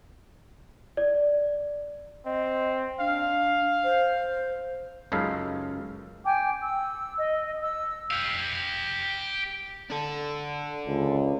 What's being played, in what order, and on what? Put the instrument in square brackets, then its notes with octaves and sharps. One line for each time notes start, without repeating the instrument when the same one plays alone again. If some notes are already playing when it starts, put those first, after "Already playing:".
[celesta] D5
[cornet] C4 [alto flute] D#5
[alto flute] D4 [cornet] F5
[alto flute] C5
[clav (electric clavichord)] C#2 F#2 C#3 D#4 A4 F5
[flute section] G5 G#5 D6
E6
D#5
E6
[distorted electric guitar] G4 F5
[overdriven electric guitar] D4 A4
[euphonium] C#2